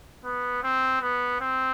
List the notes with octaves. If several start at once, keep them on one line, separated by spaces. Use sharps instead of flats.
B3
C4
B3
C4